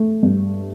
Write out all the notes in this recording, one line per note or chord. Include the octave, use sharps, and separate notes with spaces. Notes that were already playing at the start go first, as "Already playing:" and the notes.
Already playing: A3
G2